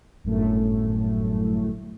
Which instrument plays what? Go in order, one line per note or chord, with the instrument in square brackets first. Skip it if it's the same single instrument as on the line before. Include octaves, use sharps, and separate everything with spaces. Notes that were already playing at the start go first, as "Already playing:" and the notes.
[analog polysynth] G1 F#2 A2 A3